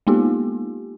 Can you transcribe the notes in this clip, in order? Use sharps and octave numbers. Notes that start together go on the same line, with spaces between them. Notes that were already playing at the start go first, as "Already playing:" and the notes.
G#3 A#3 B3 D#4 F4 G4